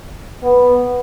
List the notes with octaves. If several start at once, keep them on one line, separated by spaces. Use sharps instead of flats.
B3